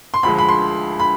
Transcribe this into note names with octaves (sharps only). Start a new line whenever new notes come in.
C6
D2 D3 F3 G#3 B5
B5
C6
B5